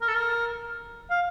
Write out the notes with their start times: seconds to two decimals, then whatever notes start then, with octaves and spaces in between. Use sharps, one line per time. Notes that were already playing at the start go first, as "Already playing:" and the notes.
0.01 A#4
0.08 A4
0.15 A#4
1.10 F5